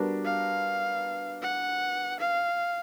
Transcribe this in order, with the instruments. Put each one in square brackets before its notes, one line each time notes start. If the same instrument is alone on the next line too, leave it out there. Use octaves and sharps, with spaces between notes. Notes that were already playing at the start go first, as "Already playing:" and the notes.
Already playing: [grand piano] G3 B3 D4 F#4 A#4
[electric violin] F5
F#5
F5